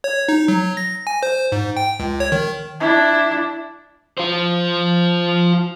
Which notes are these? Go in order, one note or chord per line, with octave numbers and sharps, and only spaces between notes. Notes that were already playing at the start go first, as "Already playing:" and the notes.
C#5
D#4
F#3
A#6
G#5
C5
G#2
G5
C#2
C#5
D#3
D4 E4
F4 C5